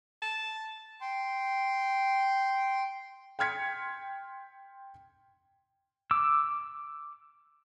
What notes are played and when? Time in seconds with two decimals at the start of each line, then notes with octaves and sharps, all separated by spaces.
0.22 A5
1.00 G5 C6
3.39 G5 C6 F6 G#6 B6 C#7
6.11 D6 E6